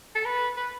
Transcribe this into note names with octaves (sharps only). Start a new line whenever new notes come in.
A4
B4
B4